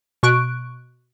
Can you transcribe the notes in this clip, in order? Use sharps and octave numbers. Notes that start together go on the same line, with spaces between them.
B2 C#6 F#6 D7